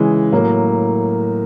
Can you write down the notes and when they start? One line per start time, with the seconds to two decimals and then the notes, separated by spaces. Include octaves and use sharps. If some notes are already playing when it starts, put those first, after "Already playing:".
Already playing: C#3 E3 G#3
0.32 A2 F#3 A#3